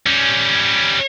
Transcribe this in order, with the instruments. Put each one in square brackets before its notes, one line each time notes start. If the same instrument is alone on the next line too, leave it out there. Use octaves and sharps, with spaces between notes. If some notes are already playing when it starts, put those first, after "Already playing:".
[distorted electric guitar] G3 C#4